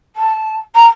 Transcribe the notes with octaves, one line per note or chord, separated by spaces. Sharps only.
A5
A#5